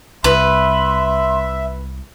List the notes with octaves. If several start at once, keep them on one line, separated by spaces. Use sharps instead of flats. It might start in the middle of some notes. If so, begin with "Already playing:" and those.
C2 B4 E5 C6